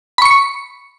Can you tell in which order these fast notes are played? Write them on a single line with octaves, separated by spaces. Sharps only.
B5 C#6 C#7